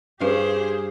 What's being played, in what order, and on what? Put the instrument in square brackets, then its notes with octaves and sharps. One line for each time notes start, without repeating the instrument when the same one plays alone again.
[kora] G2 F5 [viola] G4 G#4 [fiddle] C5